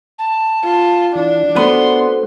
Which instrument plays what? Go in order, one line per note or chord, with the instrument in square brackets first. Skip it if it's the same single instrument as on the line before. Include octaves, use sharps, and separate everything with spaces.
[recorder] A5
[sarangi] F4
[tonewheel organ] E3 [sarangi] D4
[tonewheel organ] A3 F#4 C5 [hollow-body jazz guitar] B3 B4 [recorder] C6